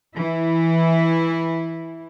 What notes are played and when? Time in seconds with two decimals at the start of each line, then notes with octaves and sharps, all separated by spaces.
0.15 E3 E4